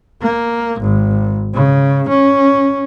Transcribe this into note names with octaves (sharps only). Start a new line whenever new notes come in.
A#3
G#1
C#3
C#4